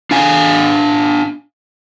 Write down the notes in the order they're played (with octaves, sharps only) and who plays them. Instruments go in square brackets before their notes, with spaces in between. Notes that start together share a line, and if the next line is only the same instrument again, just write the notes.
[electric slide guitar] D4 F5 G#5